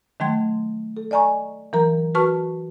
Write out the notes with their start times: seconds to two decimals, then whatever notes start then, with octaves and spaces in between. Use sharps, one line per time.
0.20 D#3 F#3 A3 G5 C6 G#6
0.97 A4
1.11 D5 D#5 G#5 A#5 C#6
1.73 E3 F#3 A#4 A#5
2.15 F#4 B4 A5 C#6 F6